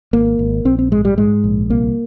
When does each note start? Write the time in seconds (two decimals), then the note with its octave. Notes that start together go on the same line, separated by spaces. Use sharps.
0.13 G#1 A#3
0.39 G#1
0.65 A#1 C4
0.79 C4
0.91 G#2 G#3
1.05 G3
1.18 G#2 G#3
1.44 A#1
1.70 C2 A#3